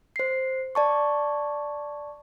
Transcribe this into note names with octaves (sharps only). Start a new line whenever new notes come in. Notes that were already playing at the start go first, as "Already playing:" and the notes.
C5 C7
D5 A5 C#6